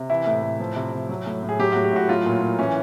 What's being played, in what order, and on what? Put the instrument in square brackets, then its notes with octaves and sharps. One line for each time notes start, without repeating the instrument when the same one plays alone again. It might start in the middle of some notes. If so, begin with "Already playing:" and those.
Already playing: [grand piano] C3
E3 E4
A2
A2
F3
C3
C3
F#3
A2
A2
G#4
F#3 G4
A2 F#4
G4
A2 F#4
F#3 F4
A#2
A#2
E3 C#4